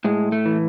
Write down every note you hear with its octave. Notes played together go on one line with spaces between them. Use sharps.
A2 G#3
A3
E3